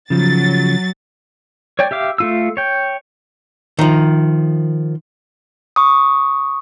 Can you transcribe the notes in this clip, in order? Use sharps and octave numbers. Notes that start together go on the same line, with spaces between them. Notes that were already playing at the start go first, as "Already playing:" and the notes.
C#3 F3 F#3 A6
C#5 D5 G5
G4 E5 F5 D6
A3 F4 E6
C#5 G5
D#3 F3
C#6 D#6